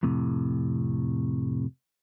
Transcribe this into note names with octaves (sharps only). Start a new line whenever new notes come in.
F2 A2 C3